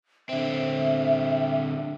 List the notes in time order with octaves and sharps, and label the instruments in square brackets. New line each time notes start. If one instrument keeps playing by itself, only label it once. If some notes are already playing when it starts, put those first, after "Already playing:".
[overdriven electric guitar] D3 C4 [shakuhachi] E5